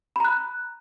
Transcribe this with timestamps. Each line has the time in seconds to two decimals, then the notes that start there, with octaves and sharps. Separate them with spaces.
0.16 B5
0.20 A#5
0.25 F#6